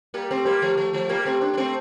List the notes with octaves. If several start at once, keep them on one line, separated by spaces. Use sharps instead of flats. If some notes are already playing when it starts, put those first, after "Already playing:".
G3 A#3
A3 C4
G3 A#3
F3 A3
A#3
F3 A3
F3 A3
G3 A#3
A3 C4
A#3 D4
D4
A3 C4